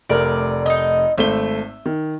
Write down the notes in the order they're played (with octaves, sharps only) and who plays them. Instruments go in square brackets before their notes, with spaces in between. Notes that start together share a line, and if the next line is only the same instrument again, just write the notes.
[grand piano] F1 A3 A#4 [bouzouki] D5
[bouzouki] D#4 D#5
[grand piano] G#1 A3 G7 [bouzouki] E5
[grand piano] D#3